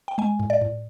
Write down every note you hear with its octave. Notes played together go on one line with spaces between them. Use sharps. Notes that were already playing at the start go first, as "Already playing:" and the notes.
G5
G#3 G#5
A2
D5
A2